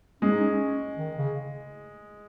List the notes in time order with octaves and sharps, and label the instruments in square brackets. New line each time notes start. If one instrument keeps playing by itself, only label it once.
[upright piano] G#3 [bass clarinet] C#4
[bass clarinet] D#4
C#4
D#3
C#3